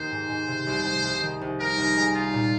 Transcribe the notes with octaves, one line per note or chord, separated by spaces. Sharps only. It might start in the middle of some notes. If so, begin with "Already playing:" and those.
Already playing: D#2 D#3 C4 C5
G#2
G#2
C3
C2
C2
C2
D#3
C2
D#4 A#4
C2
G#3
D#4 F4
A#2